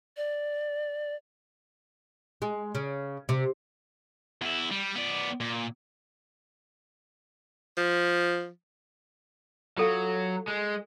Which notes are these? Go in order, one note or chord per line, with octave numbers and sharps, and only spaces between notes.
D5
G#3
C#3
C3
E2 E4
G3
B3 D5
A#2
F3
F#3 F4 A4 F5
G#3